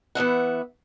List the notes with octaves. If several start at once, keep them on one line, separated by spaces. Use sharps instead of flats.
E3 B3 E5 F#5